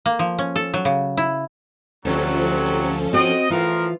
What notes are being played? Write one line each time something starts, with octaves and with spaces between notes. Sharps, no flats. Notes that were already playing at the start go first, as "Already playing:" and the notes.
A#3
F3
C#4
A4
F#3
C#3
E4
D2 C3 F3 F#3 C#4 A4
C4 F#4 D#5 G5
A2 E3 F3 F4 A#4